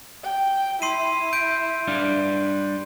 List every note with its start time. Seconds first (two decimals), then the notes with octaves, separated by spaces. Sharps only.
0.24 G5
0.82 E4 C6 C7 D#7
1.33 G6 D7
1.88 G3 D4 F5